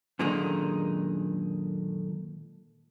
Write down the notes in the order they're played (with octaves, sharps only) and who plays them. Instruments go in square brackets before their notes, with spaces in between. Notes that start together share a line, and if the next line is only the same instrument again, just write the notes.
[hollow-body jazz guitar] F#2 A#2 D3 D#3 G#3 D#4